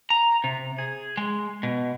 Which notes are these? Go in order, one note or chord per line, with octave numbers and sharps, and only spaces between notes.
A#5
C3
G#4
G#3
B2